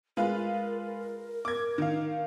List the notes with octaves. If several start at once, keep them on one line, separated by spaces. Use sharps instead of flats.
G#3 F4 A#4 B4
D6 G#6
D#3 F5